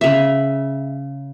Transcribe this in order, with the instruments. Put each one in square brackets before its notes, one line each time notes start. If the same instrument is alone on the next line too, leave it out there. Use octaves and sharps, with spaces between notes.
[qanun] C#3 E5